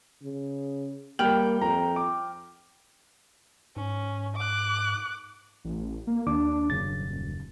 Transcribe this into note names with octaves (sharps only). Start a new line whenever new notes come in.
C#3
G3 A#3 G5 F6 F#7
F2 A#5
D6
G#2 C#4
D6 F#6
A1
A#3
D#2 D4 D6
D#1 F#2 C#3 A6